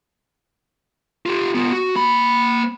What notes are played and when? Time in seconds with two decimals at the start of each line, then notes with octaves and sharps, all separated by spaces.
1.26 F4 G4
1.54 B3 F4
1.72 F#4
1.95 A#3 B5